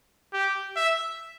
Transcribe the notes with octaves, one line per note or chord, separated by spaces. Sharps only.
G4
E5